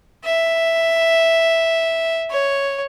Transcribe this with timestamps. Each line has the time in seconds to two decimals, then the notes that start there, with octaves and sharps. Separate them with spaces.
0.24 E5
2.30 C#5